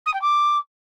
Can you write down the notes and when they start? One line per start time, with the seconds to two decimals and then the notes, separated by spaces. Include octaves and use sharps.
0.06 D#6
0.14 G5
0.21 D6